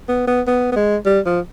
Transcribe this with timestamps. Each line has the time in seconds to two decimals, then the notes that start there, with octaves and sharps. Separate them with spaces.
0.09 B3
0.27 B3
0.47 B3
0.72 B3
0.76 G#3
1.06 G3
1.26 F3